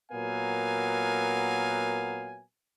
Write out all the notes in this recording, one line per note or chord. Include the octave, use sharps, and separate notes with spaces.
A#2 F#3 B3 A#4 F5 G#5